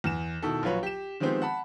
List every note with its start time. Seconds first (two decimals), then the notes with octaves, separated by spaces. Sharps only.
0.04 E2 E3 E7
0.42 B2 D#3 E4 A4
0.63 A#1 F#3 F4 B4 C#5
0.83 G4 E7
1.20 D#3 F3 G#3 B3 C4 G4
1.42 F#5 A5 B5